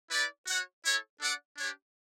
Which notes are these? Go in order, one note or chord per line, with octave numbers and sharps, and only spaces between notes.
E4 B4 D5
F#4 C#5 F#5
E4 A4 C#5
D4 A4 D5 F#5
D4 G4 C#5